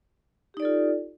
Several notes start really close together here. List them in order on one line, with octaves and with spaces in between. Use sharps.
G4 D#4 D5 A4 F4